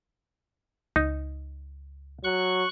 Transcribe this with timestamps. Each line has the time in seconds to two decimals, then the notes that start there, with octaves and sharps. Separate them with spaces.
0.96 C#2 D#4
2.24 F#3 C#6 F#6